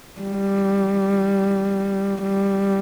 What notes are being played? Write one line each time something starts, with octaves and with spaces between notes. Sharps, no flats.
G3
G3